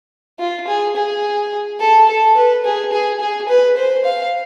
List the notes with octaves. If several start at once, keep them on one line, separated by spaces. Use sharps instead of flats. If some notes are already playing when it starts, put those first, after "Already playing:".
F4
G#4
G#4
A4
A4
B4
G#4
G#4
G#4
B4
C5
F5